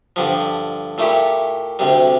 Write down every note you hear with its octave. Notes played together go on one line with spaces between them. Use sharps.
G2 D3 F3
A#2 A3 E4 G4
D2 C3 G3